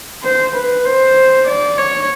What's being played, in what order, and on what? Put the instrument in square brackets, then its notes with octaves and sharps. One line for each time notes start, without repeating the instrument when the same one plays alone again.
[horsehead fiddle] C5
B4
C5
D5
C#5